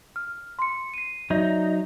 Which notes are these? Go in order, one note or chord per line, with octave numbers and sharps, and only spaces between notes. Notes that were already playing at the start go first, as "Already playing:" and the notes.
F6
C6 C#7
C7 D#7
F#3 D#4 D5 E5